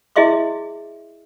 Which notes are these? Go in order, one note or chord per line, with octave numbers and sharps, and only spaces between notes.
E4 G#4 D#5 E5 C6 D6